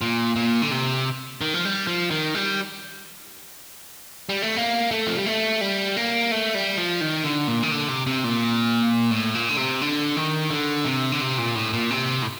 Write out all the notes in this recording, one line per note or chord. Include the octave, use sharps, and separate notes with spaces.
A#2
A#2
D3
C3
D#3
F3
G3
F3
D#3
G3
G3
A3
A#3
A3
F3
G3
A3
G3
A#3
A3
G3
F3
D#3
D3
A#2
D#3
D3
C3
C3
A#2
A2
A#2
D3
C3
D3
D#3
D3
C3
D3
C3
A#2
A2
A#2
C3
A2